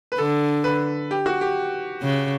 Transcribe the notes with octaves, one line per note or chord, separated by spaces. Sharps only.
B4
D3 A4
B4
G4
F#4
G4
C#3